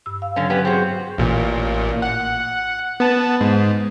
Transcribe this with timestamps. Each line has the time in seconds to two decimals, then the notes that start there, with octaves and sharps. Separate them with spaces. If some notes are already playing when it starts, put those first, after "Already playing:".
0.06 G2 E6
0.22 F5
0.36 D3 F#3 C#4
0.50 B3 C#4 G4
0.65 C4 F#4 G#4
1.18 A1 A#2
2.02 F#5
3.00 B3 A5
3.41 G#2